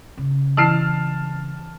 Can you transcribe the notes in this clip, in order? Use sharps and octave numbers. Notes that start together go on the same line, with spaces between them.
C#3
E3 E4 A5 F6 C7